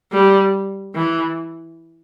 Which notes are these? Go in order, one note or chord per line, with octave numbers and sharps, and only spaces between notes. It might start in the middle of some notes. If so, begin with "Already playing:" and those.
G3
E3